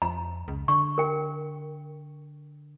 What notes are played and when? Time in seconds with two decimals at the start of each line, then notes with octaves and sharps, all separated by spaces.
0.02 F2 A#5
0.48 C#2
0.68 D3 C#6
0.98 A#4 G5